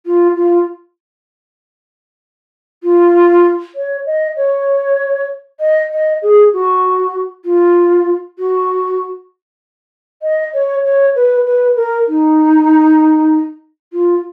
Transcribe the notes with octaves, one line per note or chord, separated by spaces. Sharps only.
F4
F4
F4
C#5
D#5
C#5
D#5
D#5
G#4
F#4
F4
F#4
D#5
C#5
C#5
B4
B4
A#4
D#4
F4